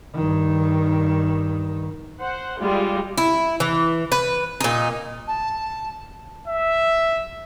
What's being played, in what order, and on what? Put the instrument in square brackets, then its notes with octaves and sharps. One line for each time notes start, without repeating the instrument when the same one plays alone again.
[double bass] G2 D#3
[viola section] C5 F#5
G3 G#3 F4 G4
[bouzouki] E4
E3
B4
A#2 D#4
[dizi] A5
[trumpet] E5